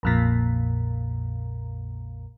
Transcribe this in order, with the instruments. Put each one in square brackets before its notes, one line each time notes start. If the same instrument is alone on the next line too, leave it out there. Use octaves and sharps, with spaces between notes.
[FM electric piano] A#1 F2 A#2